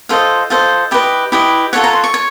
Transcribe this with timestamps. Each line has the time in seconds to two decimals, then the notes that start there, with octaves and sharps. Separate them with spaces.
0.09 F4 A4 C5 D#5 F5
0.50 F4 A4 C5 D#5 F5
0.91 E4 G4 B4 D#5
1.32 E4 G4 B4 D#5
1.73 F4 A4 C#5 F#5
1.84 A#5
1.93 C6
2.04 C#6
2.14 C#5